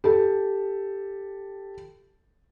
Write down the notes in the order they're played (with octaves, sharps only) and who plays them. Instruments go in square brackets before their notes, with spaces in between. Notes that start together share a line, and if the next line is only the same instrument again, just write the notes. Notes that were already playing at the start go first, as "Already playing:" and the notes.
[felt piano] G4 A4